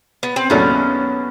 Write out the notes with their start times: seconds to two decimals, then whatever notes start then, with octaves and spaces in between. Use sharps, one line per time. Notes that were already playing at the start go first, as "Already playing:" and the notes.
0.23 B3
0.36 C4
0.50 D#2 C#3 F#3 A3 B3 C#4 D4